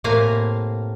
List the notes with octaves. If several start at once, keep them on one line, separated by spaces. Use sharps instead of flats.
A2 C3 A#3 F5 G#5 A#5